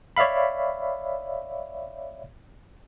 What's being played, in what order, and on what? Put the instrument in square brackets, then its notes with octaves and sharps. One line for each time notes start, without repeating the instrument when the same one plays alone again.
[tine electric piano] C#5 D5 E5 F5 B5